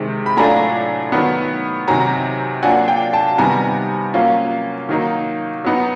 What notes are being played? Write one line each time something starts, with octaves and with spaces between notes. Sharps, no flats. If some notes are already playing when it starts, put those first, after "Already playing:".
Already playing: C3 D#3 G#3
B5
A2 F#3 A3 D4 F4 G#5 A#5
D#3 F#3 B3
C3 D#3 F#3 G#5 A#5
F#3 A#3 D4 F4 F#5 G#5
F5 G5
G5 A5
C3 D#3 G3 B3 G#5 A#5
F#3 A#3 C#4 F4
D#3 F#3 A#3 D#4
F#3 B3 D#4